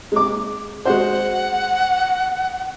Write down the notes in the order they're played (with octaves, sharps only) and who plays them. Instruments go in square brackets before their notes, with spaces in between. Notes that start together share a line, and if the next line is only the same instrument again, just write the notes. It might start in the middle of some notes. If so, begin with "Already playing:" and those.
[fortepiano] G#3 D6
[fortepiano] G#3 F#4 C5 [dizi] F#5